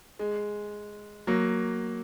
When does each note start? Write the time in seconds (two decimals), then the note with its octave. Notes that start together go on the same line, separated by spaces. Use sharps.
0.19 G#3
1.27 F#3 A#3